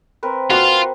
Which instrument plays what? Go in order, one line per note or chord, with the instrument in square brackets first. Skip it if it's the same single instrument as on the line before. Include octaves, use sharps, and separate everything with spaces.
[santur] C4 A#4 B4
[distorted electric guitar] F4 [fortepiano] F#4 C6